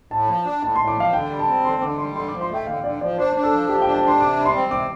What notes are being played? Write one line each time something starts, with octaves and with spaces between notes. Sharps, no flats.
A2 A5
F3
D4
A2 A5
A2 C6
D6
F3 F5
D3 G5
G3
A5
C4
D3 C6
D3 D6
G3 C6
D3 C6
D6
F3
C6
A3 G5
D3 F5
D3 D5
F3 D5
D4 C5
D4
A4
F3
F3 G4
G5
D4
A5
D4 C6
C3 D6
G3
C6
C4
C3 D6